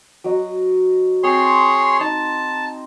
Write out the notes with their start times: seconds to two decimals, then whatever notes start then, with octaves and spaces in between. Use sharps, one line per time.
0.24 F#3 D#5
1.23 C4 G#4 C#5 C6
2.00 D#4 A5